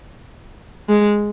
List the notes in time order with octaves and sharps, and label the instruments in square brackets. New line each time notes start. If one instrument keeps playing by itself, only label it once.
[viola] G#3